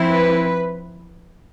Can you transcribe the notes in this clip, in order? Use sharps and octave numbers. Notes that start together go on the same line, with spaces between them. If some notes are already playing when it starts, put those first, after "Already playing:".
Already playing: F3 C4 E4
B4